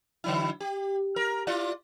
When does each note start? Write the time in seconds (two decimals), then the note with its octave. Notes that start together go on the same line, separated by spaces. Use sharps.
0.24 D3 F#3 E4
0.60 G4
1.16 A#4
1.47 E4 F4 D5